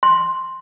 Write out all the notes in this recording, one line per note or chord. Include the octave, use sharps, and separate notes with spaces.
C6